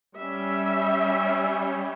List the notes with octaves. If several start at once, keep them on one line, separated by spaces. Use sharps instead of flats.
G3 C#4 E5